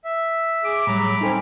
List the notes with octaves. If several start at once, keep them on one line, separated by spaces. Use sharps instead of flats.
E5
G#4 D6
A2 F#3 G3 A#5 B5 D6
C4 C#4 D#4 A4 C5